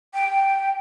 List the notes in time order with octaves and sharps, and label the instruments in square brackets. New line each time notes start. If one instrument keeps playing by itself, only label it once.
[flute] G5